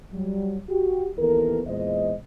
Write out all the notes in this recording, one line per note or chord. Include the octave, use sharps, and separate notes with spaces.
F#3 G3
F#4 G4
D#2 E3 B3 A4 A#4
E2 A#2 G#3 C5 D#5